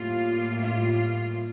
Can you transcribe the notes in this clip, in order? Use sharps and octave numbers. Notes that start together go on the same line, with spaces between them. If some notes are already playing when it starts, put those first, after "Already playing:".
Already playing: A2 G3 A#3 F4
F4